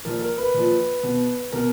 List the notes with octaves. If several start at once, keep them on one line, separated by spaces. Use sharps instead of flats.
A#2 F3 A#4
A#4
B4
A#2 F3
B2
B2 A#4